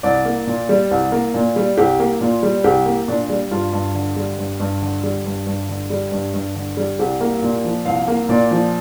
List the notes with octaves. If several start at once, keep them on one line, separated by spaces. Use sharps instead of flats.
C2 D5
A#3
A#2
G3
C2
A#3
A#2
G3
C2 G4
A#3
A#2 F4
G3
C2 G4
A#3
A#2 D4
G3
G2 F4
G2
D3
G3
G2
G2
D3
G3
G2
G2
D3
G3
G2
G2
D3
G3
C2 G4
A#3
A#2
F3
C2 F5
A#3
A#2 D5
F3